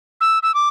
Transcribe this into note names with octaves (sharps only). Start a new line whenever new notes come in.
E6
E6
D6